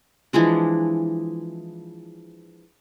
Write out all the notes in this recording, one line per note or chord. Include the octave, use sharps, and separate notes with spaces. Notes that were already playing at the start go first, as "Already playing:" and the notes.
E3 F3 G#3 D4